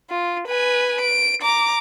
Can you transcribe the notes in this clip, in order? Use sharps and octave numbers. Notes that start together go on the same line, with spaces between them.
F4
B4 G#5
D7
A#5 D6